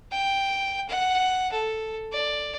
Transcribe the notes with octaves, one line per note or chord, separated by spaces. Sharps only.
G5
F#5
A4
D5